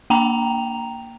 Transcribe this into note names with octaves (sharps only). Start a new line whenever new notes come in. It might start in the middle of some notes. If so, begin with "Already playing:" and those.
A#3 G5 A#5 F7